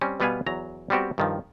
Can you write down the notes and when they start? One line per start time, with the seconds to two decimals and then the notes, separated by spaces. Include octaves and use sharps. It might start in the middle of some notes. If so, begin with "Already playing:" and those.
0.01 G3 C4 C#4
0.20 B2 G3 B3 B4 F5 G#5
0.46 E2 F#3 A#5
0.90 G3 B3 C4 F#4 G4
1.18 G2 D#3 F3